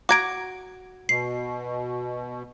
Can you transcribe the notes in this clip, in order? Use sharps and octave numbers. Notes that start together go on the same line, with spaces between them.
F#4 A#5 D6 G#6 D7
B2 C7